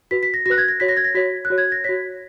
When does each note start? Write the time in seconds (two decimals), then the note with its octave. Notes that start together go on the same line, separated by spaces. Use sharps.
0.11 F#4 B4 B6
0.23 B6
0.34 A#6
0.46 F#4 A#6
0.50 B4 F#6
0.58 G#6
0.68 A#6
0.80 F#4 C#5 B6
0.89 A#6
0.97 G#6
1.04 A#6
1.15 F#4 C#5 B6
1.45 F#6
1.50 F#4 C#5
1.58 G#6
1.72 A#6
1.84 F#4 C#5 B6